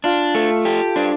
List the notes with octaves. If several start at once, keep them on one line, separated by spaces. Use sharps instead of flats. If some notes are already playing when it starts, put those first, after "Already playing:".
D4 F4
A3 A4
G4 A4
D4 C5